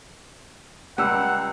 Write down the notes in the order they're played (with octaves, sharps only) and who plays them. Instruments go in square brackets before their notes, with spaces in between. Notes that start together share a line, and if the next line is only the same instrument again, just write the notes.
[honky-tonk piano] C#2 E6 [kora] G3 [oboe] F#5